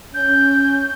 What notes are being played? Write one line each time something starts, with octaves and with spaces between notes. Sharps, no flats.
C#4 G6